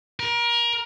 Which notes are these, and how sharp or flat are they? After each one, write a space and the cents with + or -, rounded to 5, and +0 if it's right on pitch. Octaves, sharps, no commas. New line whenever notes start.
A#4 +25